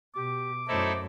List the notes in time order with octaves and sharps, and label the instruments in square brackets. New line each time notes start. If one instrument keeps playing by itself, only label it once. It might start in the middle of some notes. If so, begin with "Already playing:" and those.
[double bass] B2 [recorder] G4 [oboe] D6
[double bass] F#2 A3 [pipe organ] D#4 E4 A4 [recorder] C5